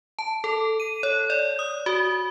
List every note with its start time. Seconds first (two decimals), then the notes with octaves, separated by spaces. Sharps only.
0.19 A5
0.44 A4
0.80 D#7
1.03 C#5
1.30 D5
1.59 D#6
1.86 F#4